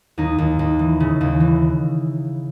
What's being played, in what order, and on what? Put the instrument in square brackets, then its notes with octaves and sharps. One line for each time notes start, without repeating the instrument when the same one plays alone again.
[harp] D#2 D#4
D#2
D#2
E3
C#3
D#2
E3